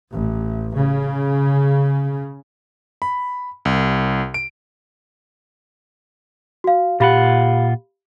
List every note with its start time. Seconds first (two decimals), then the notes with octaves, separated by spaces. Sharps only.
0.12 A1
0.75 C#3
3.02 B5
3.65 C2
4.34 D7
6.64 F#4 F5
7.00 A#2 F4 G4 F5 F#5 B5